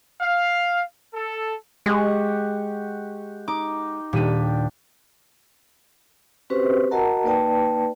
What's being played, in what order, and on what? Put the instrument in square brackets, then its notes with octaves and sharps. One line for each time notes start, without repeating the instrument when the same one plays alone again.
[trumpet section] F5
A4
[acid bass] G#3 [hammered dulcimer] G4 F#5 C#6
[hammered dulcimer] D#4 [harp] D6
[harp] D#1 B6 D#7 [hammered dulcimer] D4 G4
[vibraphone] C4 C#4 F#4 G4 B4 C5
F#4 A#4 D#5 F#5 A5 A#5
A#3 D#4 B4 D5 G5 A5